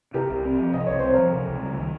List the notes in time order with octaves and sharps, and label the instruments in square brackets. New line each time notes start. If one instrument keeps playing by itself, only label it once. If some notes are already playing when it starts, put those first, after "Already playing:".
[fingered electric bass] C3 [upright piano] G4 A#4
[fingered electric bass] C2
C4
F3
[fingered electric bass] C3 [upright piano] D#5
[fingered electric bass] C2 [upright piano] C#5
[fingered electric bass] C4 [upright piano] C5
[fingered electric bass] F3 [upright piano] A#4 C#5
[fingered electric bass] C3
C#2
G3
D#3